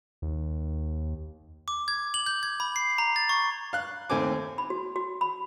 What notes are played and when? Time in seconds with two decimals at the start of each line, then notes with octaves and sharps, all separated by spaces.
0.22 D#2
1.68 D6
1.88 G#6
2.14 F#7
2.26 G6
2.43 G#6
2.60 B5
2.76 C7
2.98 A#5
3.16 A6
3.29 C#6
3.73 F5 F#6
4.10 D#2 A3 C4 G#5 D6
4.58 B5
4.70 F#4
4.96 F#4
5.21 B5